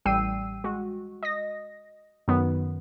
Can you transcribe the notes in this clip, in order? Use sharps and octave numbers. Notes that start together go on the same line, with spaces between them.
A1 G3 G5 E6 C7 D#7
G#3 F#4
D#5 A#6
F#2 D#3 F#3 B3